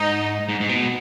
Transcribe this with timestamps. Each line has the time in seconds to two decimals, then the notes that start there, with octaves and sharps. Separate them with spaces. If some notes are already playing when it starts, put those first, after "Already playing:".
Already playing: G#2 D#4
0.49 G#2
0.60 G#2
0.69 B2